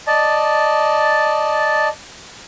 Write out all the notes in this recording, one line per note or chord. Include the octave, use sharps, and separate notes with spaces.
D5 D#5 A5